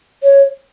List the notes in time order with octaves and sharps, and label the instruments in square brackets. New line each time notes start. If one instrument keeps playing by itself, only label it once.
[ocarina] C#5